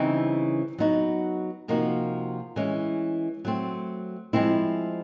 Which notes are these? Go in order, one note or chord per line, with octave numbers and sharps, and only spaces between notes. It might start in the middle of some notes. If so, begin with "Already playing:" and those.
Already playing: C#3 E3 G3 C4 D#4
F#3 B3 D#4 F#4
C3 F3 A#3 D#4 F#4
E3 G#3 C#4
F#3 A3 C4
F3 G#3 C4 E4